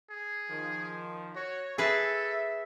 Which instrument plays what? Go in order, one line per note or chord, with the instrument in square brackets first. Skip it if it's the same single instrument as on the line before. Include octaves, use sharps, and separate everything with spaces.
[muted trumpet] G#4
[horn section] D#3 F3
[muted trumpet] F#4 [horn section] C#5
[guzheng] G#4 B4 A5 [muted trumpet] A4 [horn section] E5